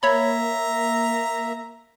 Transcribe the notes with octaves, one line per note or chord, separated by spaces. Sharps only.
A#3 C#5 E5 A#5 B5